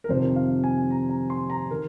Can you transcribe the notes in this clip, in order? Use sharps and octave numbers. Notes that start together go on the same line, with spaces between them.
A#4
F2 C3 D#3 C5
F5
G#5
A#5
A#5
C6
A#5
D#3 A#4